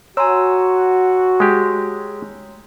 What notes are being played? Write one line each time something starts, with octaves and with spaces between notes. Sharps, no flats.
F#4 C#5 G#5 A#5 C6 E6
G#3 G4